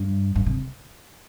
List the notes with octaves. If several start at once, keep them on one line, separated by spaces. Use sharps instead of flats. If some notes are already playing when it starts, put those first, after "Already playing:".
Already playing: G2
G2
C3